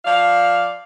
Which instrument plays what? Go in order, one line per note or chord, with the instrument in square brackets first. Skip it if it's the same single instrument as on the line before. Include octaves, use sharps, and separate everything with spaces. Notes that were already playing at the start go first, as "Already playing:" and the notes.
[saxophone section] F3 D5 F5